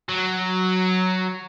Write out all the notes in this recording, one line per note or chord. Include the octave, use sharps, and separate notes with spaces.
F#3